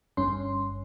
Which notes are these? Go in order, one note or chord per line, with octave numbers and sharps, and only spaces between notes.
G1 G2 C#4 C6